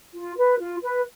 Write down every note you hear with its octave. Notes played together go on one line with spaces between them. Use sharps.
F4
B4
F4
B4